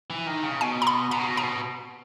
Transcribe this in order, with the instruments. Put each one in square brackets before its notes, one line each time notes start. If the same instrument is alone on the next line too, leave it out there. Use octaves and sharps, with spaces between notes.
[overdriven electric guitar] E3
D#3
C#3
[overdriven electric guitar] B2 [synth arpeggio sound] G#5
[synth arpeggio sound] A#5
B5
[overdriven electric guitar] B2 [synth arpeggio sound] A#5
[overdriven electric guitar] C#3
B2
[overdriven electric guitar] C#3 [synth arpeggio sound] A#5
[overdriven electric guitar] B2